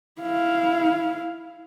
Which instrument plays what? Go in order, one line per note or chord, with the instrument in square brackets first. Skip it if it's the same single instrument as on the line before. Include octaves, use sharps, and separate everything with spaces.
[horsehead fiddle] E4 F5